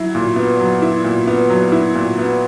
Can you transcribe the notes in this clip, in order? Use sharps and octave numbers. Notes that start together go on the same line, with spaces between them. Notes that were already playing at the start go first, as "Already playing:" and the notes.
Already playing: F#3 E4
A#2
B3
F#3
E4
A#2
B3
F#3
E4
A#2
B3